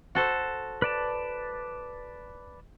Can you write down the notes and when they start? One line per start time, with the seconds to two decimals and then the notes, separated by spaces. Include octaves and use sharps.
0.15 F#4 A4 C5
0.82 B4 D5 A5